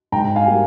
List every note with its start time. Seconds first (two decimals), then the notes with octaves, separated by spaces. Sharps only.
0.12 G#2 G5 A#5
0.36 F5 G#5
0.47 G3 A#3